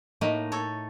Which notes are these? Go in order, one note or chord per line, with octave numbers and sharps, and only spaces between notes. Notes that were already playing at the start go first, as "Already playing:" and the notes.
A2 A3 A#3 D#4 D#5
A4 C#5